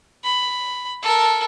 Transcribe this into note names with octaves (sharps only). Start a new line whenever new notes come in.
B5
A4 A#4